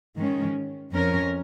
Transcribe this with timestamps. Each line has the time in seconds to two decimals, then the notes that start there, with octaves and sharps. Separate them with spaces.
0.17 G#2 D#3 G#3 C#4
0.93 F2 F3 C#4 A#4